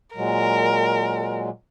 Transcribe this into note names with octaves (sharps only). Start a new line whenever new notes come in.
A#2 F#3 G#3 A#4